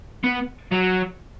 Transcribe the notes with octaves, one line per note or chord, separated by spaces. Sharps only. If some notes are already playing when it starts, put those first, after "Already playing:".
B3
F#3